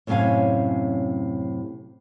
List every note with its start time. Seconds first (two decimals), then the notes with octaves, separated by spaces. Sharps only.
0.07 F#2 A2 C3 C#4 F5 G#5